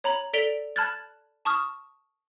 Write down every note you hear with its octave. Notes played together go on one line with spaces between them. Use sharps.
C#5 A#5 B5 F#7
A4 D5 B6 D7 F7 G7
A5 B5 F6 F#6 G#6 A6
A5 C#6 D#6 F6